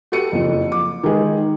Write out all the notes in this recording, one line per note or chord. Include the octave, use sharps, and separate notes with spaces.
F#4 G4 A4 C#7 D#7
F#1 F2
D6
D#3 G#3 G#4 A#4